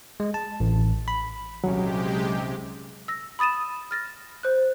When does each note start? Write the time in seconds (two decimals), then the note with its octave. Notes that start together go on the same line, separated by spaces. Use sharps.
0.20 G#3
0.34 A5
0.60 A1
1.08 B5
1.64 D#1 C2 C3 F#3 G#3 C#4 G4
3.08 E6 A#6
3.39 B5 D#6 A6 D#7 E7
3.91 F6 A6 A#6
4.43 C5 F#6